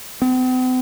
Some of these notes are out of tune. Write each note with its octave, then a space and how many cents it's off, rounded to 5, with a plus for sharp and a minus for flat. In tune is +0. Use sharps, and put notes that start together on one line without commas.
C4 -45